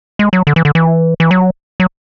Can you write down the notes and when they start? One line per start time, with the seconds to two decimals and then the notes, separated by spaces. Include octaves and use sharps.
0.19 G#3
0.33 F#3
0.47 D3
0.56 E3
0.65 D3
0.75 E3
1.20 E3
1.31 F#3
1.80 F#3